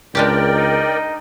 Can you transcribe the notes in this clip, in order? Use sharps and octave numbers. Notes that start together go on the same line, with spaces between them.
C#2 G#3 D4 G4 A#4 D5 G5
D#4